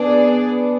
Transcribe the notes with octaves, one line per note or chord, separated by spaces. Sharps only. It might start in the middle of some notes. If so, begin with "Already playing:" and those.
Already playing: B3 D4 G#4 D5